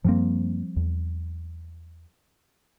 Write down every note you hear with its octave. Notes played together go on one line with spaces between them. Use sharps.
F#2 F3 G3 A#3 C4
E2